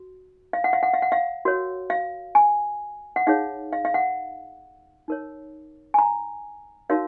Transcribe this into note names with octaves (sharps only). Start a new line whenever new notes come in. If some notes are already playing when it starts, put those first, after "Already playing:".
Already playing: F#4
F5
F#5
F5
F#5
F5
F#5
F5
F#4 A#4 C#5
F5
G#5
F#5
D#4 G#4 C#5 F5
F5
F5
F#5
D#4 A#4 C#5
G#5
A#5
D#4 F#4 A#4 C#5 F5